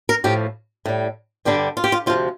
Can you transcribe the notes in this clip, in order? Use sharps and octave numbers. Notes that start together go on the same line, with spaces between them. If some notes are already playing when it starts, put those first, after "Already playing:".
A#4
A2 F3 G4
A2 G3
G2 D3 G3 G4
F4
G4
F4
D2 C3 F3 F4